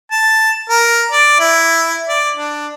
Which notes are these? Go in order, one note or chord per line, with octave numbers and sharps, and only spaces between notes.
A5
A#4
D5
E4
D5
D4